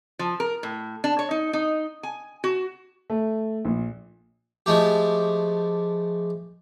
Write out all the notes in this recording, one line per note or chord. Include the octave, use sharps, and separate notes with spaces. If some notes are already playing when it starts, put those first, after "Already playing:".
F3
A#4
A2
D4
C#5
D#4
D#4
G#5
F#4
A3
A#1
F3 G#3 A3 G4